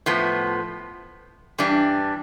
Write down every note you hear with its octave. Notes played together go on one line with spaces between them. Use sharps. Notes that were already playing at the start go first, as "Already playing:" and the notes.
A2 F3 B3
G2 E3 G3 D4